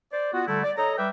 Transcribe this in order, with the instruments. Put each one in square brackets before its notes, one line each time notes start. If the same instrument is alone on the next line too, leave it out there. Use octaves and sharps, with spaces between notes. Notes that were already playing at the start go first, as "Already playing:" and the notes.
[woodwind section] C5 D5
B3 F4 F#4
D3 G3 A3 E4 A4
D5
A4 C#5 D#5 A#5
G3 B4 E5 G5 D6